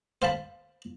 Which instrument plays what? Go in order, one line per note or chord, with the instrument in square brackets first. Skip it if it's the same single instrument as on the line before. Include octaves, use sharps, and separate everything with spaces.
[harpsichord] C5 F5 A5 B5